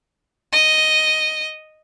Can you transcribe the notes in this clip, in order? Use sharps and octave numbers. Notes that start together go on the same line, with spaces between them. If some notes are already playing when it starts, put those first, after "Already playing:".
D#5